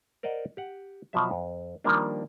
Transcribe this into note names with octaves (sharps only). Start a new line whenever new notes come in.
A#4 C5 D5 D#5 F#5
G4 F#5
B2 F3 F#3 E5
F2
D#3 F3 G3 A#3 D4